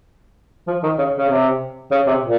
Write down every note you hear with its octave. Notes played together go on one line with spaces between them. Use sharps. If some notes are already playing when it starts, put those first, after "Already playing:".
F3
D#3
C#3
C#3
C3
C#3
C3
A#2